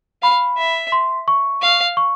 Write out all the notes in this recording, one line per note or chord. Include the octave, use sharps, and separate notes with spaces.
F5 B5
E5
C6
C#6
F5
C#6